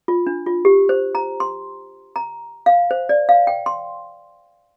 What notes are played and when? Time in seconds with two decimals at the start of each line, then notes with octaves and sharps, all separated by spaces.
0.08 F4
0.27 D4
0.46 F4
0.65 G4
0.89 C5
1.15 A#5
1.40 C6
2.16 A#5
2.66 F5
2.91 C5
3.09 D5
3.29 F5
3.47 G5
3.66 C6